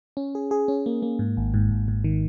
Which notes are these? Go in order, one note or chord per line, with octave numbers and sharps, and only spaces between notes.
C#4
G#4
G#4
C#4
A#3
A#3
G#2
G#1
G#2
G#1
G#2
D#3